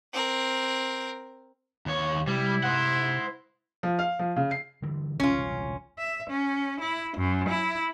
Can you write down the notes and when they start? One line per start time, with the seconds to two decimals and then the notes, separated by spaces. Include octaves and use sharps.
0.13 C4 A#4
1.86 D#2 C#5
2.27 C3 G3 E4
2.63 C5 F#5
3.83 F3
3.99 F5
4.19 F3
4.36 C#3
4.51 C7
4.82 D3 E3 G3
5.20 E1 C2 C#3 C#4 F4
5.98 E5
6.30 C#4
6.81 E4
7.17 F#2
7.49 E4